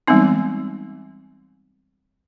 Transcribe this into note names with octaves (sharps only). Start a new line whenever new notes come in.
E3 G3 G#3 B3 C4 D#4